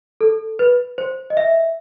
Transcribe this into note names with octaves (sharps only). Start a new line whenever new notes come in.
A4
B4
C5
D#5
E5